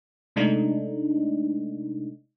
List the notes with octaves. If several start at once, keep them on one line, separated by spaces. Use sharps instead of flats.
C3 G#3 A3 D4 D#4